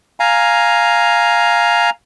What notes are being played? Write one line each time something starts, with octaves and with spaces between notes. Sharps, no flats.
F5 G#5 A#5